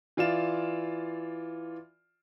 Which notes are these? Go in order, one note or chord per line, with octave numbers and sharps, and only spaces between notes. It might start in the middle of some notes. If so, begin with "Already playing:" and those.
E3 F4 D5 F5 E7